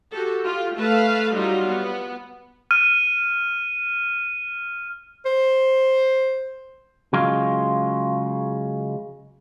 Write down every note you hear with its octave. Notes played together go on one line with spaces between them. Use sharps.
F#4 G4 A4
F4 G4
A3 B4 F5 A5
F#3 G3 D#4 F4
B3
F6 D#7
C5
C#3 F#3 G#3 F4